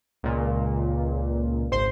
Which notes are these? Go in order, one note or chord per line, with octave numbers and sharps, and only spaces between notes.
C#2 A#2
G#1 C5 C6